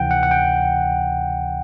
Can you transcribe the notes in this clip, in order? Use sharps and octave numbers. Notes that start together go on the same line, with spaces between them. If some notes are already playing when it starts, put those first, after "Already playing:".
Already playing: D2 C3 E3 F#5 G5
F#5
F#5
G5